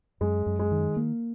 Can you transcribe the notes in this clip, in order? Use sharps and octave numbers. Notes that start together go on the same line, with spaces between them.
F#2 G#3
F#2
G#3
D#3
A#3